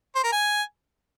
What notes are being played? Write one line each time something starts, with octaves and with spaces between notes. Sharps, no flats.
C5
A#4
G#5